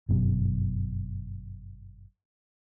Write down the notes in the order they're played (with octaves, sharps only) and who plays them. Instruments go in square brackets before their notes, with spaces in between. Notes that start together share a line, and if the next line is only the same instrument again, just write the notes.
[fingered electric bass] G1 F#2 B2